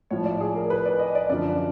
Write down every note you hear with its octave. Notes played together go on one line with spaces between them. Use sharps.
A2 F3 C#5
D5
G#4
A#4
B4
D5
D#5
D5
F#2 D3 F3 D5